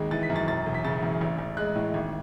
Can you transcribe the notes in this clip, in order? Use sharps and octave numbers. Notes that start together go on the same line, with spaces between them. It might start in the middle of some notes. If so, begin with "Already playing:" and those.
Already playing: G#1 D#2 G#3
E3 A6
B6
F#2
A6
E1 A6
E1
B6
C#3 A6
E2
A1
A1
G#3 F#6
A2
G#1